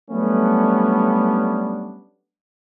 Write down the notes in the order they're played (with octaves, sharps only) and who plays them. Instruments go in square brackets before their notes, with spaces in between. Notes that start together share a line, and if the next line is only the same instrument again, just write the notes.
[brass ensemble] F#3 G3 A3 B3 C#4 D4